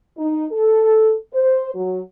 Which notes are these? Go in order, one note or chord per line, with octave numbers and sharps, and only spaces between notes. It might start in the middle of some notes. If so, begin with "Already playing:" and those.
D#4
A4
C5
F#3